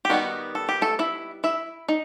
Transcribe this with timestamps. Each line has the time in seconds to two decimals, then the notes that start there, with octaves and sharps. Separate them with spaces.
0.05 G4
0.10 D#3 G3 B3 D#4 F#4
0.55 A4
0.69 G4
0.81 A3 A4
0.99 E4 E5
1.44 E4 E5
1.89 D#4